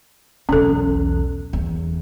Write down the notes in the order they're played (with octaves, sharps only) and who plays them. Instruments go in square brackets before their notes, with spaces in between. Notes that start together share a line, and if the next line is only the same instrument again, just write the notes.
[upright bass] B1 E2 [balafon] C#4 A4
[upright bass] E2